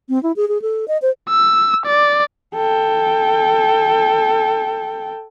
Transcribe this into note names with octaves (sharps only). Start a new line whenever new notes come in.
C4
E4
G#4
G#4
A4
D#5
C5
E6
D5
A4 G5